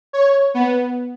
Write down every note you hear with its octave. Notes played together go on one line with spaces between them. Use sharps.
C#5
B3